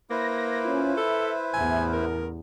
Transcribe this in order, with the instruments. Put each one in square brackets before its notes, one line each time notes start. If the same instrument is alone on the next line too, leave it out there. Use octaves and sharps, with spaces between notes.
[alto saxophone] A#3 [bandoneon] E4 B4 C5 [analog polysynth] A#6
[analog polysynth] C#4 F4
[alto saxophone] A4 [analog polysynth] E5
[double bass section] A1 E2 [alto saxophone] G#5
[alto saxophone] A#4